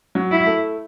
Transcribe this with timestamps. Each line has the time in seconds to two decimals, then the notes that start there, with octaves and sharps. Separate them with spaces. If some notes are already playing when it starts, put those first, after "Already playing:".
0.15 F#3
0.32 E4
0.46 A3